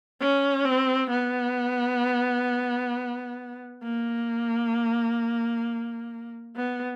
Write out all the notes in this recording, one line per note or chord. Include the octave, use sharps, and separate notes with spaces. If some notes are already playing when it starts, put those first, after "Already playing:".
C#4
C4
B3
A#3
B3